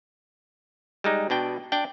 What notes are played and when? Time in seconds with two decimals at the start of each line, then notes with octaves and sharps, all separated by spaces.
1.04 G3 G#3 D#4
1.30 B2 D4 G5
1.72 D4 G5